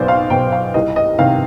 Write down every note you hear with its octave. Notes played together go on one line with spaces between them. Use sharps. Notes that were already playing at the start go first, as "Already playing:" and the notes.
Already playing: B1 B2 C5 D5
F5
B2 G5
F5
C2 D#5
D#5
C3 D#3 F5